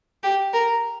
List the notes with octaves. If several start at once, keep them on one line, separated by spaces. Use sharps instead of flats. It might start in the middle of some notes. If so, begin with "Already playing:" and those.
G4
A#4